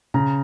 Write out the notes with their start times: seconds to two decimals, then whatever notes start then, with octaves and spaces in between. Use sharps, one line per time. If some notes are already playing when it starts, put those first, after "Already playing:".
0.14 C#3 A#5